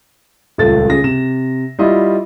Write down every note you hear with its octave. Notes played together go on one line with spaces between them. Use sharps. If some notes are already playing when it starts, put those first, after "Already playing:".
D#1 C#2 A3 A6
C#3 G#4 A#6
C3 E7
G3 E4 F4 D#5